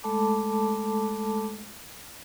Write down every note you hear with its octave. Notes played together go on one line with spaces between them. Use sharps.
G#3 A3 A4 A5 B5 D6